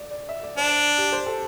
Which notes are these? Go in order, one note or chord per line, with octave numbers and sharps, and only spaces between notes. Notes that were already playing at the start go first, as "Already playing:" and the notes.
Already playing: D5
D5
E5
D5
D4 C5
G4
C5
A4